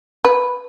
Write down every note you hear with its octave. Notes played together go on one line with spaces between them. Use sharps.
B4